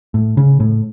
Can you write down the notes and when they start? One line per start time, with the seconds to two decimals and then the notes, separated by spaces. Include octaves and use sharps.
0.14 A2
0.37 C#3
0.60 A2